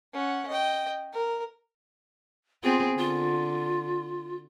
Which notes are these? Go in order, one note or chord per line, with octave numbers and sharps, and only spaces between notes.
C#4 F#5
D#5 G5
A#4
B3 C4 F4 G#4
D3 F4